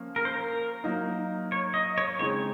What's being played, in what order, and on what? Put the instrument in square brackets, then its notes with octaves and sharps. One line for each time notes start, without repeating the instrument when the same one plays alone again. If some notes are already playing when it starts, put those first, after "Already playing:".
Already playing: [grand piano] F3 A#3 C#4
[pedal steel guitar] A#4
C5
A#4
[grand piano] F#3 A#3 D#4
[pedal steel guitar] C#5
D#5
C#5
[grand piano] C#3 G#3 C4 D#4 [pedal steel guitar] C#5